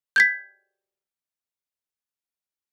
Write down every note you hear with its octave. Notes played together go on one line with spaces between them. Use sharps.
G6 G#6 B6